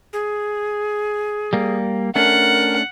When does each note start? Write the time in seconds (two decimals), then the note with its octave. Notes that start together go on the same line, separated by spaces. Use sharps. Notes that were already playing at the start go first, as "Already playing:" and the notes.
0.13 G#4
1.53 G3 A#3
2.16 A3 C#4 D4 A#4 F#5